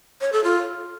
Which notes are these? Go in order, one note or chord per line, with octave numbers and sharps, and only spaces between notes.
C#5
A4
F4